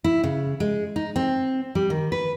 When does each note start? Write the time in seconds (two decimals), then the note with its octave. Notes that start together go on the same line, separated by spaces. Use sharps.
0.04 E4
0.24 C#3
0.60 G#3
0.96 D#4
1.16 C4
1.75 G3
1.90 D#3
2.12 B4